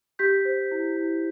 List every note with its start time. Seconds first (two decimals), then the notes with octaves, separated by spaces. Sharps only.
0.19 G4 G6 B6
0.45 C5
0.71 E4
0.97 E4